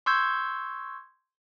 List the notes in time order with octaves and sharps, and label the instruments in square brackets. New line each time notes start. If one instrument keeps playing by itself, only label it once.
[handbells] C6 C#6 E6 G6 G#6